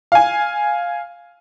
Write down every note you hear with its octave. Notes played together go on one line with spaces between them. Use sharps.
F5 G#5